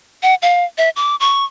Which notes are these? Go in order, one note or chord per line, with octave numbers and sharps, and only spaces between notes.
F#5
F5
E5
D6
C#6